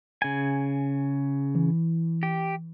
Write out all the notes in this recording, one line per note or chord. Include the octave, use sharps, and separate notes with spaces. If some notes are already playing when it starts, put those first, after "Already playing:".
C#3 G#5
E3
G4